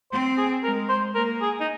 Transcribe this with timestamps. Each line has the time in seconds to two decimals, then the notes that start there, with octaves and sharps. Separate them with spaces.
0.12 C4 C5
0.37 G#4
0.63 G#3 A#4
0.89 C5
1.15 A#3 A#4
1.41 G#4
1.60 D#4